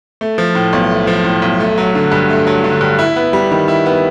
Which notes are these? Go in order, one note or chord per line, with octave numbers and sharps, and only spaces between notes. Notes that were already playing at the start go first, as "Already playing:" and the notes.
A3
F3
A2
B1
A3
F3
A2
B1
A3
F#3
D3
G2
A3
F#3
D3
G2
E4
B3
G3
D#3
E4
B3